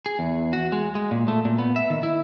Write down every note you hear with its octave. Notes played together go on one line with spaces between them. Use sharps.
G#4
E2
F#4
G#3
G#3
A#2
A3
A#2
B3
E5
D#3
E4